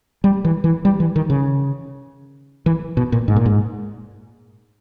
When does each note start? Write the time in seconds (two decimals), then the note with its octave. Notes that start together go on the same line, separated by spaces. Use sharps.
0.24 G3
0.45 E3
0.64 E3
0.85 G3
1.00 E3
1.16 D#3
1.30 C#3
2.66 E3
2.97 B2
3.12 A#2
3.28 G#2
3.36 A#2
3.46 G#2